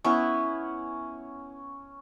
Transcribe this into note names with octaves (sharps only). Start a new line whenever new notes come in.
B3 C#4 E4